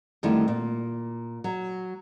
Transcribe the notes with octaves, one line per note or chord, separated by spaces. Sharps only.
F2 D3 D#3 G3 A3 E4
A#2
F#3